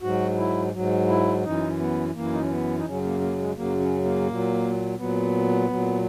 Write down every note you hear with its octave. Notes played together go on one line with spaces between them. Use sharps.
G#2 F#3 F#4
E4
G#2 F#3
E4
F#2 E3 D#4
B3
F#2 E3 A#3
D#4
C#4
B3
D#4
F#2 C#3 F#3 C#4
A#3
A#3
G#3
F#2 C#3 F#3 A#3
C#4
A#3
A#2 F#3
A#2 F#3 B3
A#2 F#3